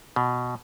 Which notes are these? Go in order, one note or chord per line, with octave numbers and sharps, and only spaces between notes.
B2